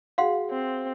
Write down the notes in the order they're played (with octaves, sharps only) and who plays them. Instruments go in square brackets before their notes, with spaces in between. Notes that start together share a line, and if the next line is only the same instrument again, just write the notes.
[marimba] F#4 G#4 [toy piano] F5 F#5 C6
[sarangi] C4